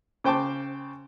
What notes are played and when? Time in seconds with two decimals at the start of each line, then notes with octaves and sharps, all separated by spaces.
0.24 C#3 C5 G5 A5 D6